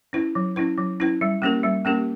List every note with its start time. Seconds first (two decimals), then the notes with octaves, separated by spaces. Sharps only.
0.13 C#4 E4 B4
0.35 F#3
0.56 C#4 E4 B4
0.78 F#3
1.00 C#4 E4 B4
1.21 G3
1.42 A#3 C#4 G4 A#4
1.63 G3
1.85 A#3 C#4 G4 A#4